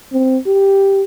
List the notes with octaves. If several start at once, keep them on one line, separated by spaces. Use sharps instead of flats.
C4
G4